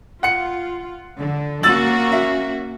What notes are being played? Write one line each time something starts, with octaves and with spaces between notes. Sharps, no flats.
F4 F#5 C#7
D3
A#3 C#4 F#4 E6 A6 F#7
E5